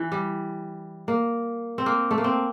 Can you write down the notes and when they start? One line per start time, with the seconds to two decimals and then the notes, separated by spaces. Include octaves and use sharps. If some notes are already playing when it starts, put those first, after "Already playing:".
Already playing: E3
0.12 G3
1.08 A#3
1.78 C4
1.86 A#3
2.11 A3
2.18 A#3
2.24 C4